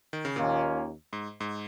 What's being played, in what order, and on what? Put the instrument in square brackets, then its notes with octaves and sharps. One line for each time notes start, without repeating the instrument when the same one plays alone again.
[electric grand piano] D#3
C#3
[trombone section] D#2 D#3 A#3 C#4 F4 [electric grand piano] A#2
[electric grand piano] G#2
G#2